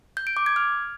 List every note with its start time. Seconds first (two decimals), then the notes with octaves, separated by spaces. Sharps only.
0.17 G6
0.27 D7
0.37 D6
0.46 G#6
0.56 F6